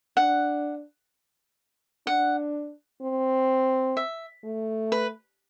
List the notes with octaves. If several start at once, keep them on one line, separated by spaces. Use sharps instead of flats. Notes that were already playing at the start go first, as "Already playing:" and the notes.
D4 F#5
D4 F#5
C4
E5
A3
B4